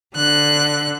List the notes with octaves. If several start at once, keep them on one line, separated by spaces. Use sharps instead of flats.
D3 F#6